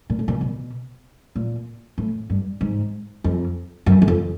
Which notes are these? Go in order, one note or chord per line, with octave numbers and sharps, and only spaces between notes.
A#2
A2
A#2
B2
A#2
A2
G2
G#2
F2
F#2
E2
F2